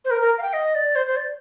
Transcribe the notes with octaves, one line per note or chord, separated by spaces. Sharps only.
C5
A#4
A#4
F5
G5
D#5
D5
C5
C5
D5